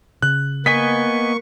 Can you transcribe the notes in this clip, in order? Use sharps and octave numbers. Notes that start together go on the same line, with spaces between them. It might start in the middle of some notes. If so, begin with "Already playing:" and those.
C#3 F#6
A#3 B3 D#5 G#5 C#6 B6